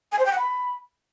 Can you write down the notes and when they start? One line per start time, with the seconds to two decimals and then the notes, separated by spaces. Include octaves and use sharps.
0.12 G#5
0.19 C5
0.25 G5
0.32 F#5
0.38 B5